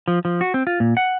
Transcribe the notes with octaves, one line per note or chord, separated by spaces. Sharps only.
F3
F3
F#4
C4
F4
A#2
F#5